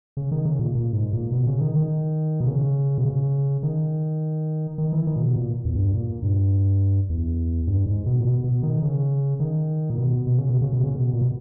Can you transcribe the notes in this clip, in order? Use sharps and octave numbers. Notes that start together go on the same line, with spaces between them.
C#3
D#3
C#3
A#2
A#2
G#2
A#2
B2
C#3
D#3
D#3
B2
C#3
B2
C#3
D#3
D#3
E3
D#3
A#2
B2
A#2
E2
G2
A#2
G2
E2
G2
G#2
B2
A#2
B2
B2
D#3
C#3
D#3
A#2
B2
B2
C#3
B2
C#3
B2
C#3
B2
A#2
B2